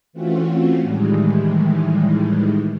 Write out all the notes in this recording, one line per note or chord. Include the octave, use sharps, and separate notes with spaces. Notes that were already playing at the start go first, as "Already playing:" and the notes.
E3 A3 C4 C#4 F4 F#4
A2 D#3 E3 G3 G#3